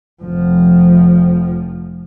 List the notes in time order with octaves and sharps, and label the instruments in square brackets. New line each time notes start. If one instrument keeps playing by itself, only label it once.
[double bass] F1 F3